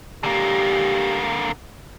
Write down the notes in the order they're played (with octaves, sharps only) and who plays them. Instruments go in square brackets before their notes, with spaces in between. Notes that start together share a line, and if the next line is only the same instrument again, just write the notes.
[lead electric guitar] D3 A#3 [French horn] G4